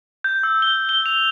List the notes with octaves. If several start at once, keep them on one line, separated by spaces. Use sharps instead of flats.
G6
E6
G7
G7
F7